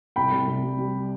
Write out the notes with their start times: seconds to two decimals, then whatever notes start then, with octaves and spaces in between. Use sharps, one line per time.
0.16 C2 G5 B5
0.32 C2
0.47 C2
0.63 G3
0.79 G3